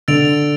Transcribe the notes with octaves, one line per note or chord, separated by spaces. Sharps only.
D3 E6 A6 D7 F7